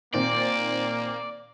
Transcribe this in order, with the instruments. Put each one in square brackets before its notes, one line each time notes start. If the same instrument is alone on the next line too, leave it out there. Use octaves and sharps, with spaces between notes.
[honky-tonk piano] A#2 D#3 C4 [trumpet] A#3 [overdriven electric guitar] D5